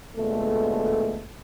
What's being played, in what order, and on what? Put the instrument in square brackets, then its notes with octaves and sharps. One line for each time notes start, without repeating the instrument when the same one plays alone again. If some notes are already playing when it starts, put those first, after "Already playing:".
[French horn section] D2 A#2 G#3 A3 B3 A4